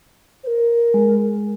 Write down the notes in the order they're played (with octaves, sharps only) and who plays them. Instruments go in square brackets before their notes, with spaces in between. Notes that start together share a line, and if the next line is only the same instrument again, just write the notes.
[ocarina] C5
A#4
[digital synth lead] G#3